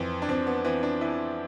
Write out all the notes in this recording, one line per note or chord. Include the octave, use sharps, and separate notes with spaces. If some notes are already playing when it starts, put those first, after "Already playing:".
Already playing: F2 E3 C4
D4
F2 C4
B3
E3 C4
D4
E3 E4